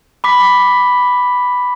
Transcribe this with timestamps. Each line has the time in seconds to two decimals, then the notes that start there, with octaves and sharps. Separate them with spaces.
0.24 B5 D6 B6